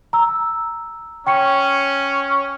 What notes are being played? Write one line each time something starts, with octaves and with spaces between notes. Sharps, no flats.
A#5 E6
C#4 G5 C#6 C#7